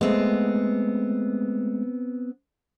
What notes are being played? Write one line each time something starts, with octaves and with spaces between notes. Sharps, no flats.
G#3 A3 B3 C4